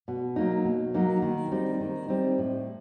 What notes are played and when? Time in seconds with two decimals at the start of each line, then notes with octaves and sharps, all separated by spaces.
0.08 B2
0.36 F#3 A#3 D#4
0.65 B2
0.94 F#3 A#3 D#4
1.22 D#3
1.51 G3 C4 D#4
1.80 D#3
2.08 G3 C4 D#4
2.38 A2